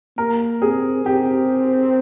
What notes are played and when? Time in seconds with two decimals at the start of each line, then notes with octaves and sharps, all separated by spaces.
0.17 A#3 A#4
0.61 C4 G#4
1.05 C4 G4